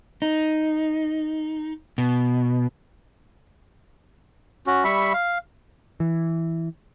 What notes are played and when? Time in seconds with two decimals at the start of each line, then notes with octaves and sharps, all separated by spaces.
0.22 D#4
1.98 B2
4.67 C#4 F#4
4.84 G3 E5 B5 C#6
5.14 F5
6.00 E3